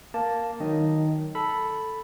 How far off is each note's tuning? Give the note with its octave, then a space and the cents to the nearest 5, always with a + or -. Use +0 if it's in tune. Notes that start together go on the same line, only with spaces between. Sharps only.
A#3 +0 A5 +0
D#3 +0 F#3 +10 D#5 +0
A4 +0 B5 +0